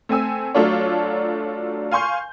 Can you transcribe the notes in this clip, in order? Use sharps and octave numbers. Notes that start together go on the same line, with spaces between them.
A3 C4 G#5 E6
F#3 A3 D4 F4 A4 C#5
F5 G#5 C6 C#6 G6